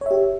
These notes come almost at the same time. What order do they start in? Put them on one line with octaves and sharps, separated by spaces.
C#5 E5 G4